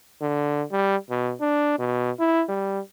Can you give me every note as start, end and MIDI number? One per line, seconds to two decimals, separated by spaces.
0.22 0.63 50
0.71 0.96 55
1.10 1.33 47
1.41 1.77 62
1.78 2.11 47
2.19 2.43 64
2.48 2.80 55